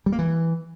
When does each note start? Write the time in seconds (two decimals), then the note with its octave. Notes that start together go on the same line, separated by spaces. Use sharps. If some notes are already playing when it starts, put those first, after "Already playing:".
0.06 G3
0.12 A#3
0.19 E3